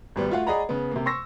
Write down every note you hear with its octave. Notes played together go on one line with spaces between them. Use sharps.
G#1 G3 B3
A3 F4 F#4 F5 F#5
G#4 D5 D#5 F#5 A#5 B5
C#3 B3
C3 A#3
C6 C#6 E6 A#6